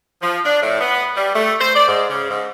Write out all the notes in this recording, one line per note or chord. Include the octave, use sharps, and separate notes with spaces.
F3
D4
A2
B3
G3
A3
C5
D5
G#2
C#3
G#2